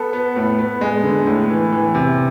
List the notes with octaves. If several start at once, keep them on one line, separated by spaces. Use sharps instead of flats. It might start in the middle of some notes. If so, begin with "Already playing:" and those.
Already playing: B3 A4
B3
A2
B3
G#3
D3
A2
E3
E3
C3